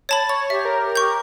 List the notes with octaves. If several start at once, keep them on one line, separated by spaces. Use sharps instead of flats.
C#5 A5 B5 A6
C#5 A6
G4 E5
A#4
C#6 G6